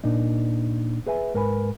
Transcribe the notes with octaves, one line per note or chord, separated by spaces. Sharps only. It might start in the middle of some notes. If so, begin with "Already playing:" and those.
A#2 D4 D#4
G#4 B4 E5 G#5
G#2 A#4 B4 G#5 B5